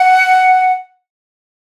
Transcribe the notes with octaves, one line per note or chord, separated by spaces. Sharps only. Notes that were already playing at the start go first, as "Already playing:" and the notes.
Already playing: F#5